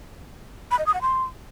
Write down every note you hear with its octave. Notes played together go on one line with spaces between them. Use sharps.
B5
D#5
D#6
F#5
C6